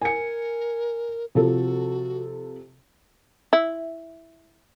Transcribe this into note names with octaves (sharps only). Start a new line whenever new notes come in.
A#4 G#5 C#7
C3 F3 F#4 A4
E4